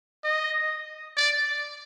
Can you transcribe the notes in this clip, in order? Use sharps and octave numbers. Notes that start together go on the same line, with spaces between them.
D#5
D5